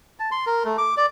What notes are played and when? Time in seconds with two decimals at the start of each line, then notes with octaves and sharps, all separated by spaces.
0.20 A5
0.32 C6
0.46 A#4
0.65 A3
0.78 D6
0.97 D5